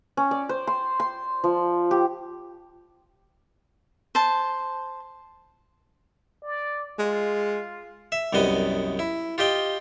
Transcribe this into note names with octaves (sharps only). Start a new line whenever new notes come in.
C#4
D5
C5
C6
C6
F3
G4
C5 A5
D5
G#3 F4
E5
C2 F#2 G3 B3 D#5 D#6
E4
F4 G4 D#5 G5